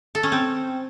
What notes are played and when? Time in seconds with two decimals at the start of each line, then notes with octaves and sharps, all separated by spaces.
0.15 A4
0.23 C#4
0.32 C4